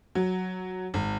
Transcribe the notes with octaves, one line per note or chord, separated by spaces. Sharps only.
F#3
G#1